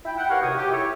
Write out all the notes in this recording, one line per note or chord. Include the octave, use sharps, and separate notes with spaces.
E4 G5
E5 F#5 G5
G4 A#4 B4 C#5 F5 F#5
D#2 C3 F#4 C#5 D#6
G4
E4 A4 C#5